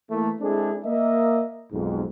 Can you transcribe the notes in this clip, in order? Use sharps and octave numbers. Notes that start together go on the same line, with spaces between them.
E3 A3 A#3
G#3 C4 D4 E4 G#4 A4
A#3 D#5 E5
B1 F2 G#2